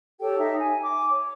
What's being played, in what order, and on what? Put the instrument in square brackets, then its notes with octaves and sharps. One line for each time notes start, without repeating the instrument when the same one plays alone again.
[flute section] G4 A4 C#5 G5
D#4 E5
G#5
D6
C#5